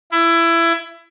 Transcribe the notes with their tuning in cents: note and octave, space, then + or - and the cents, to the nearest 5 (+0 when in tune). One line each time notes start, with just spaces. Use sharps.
E4 +20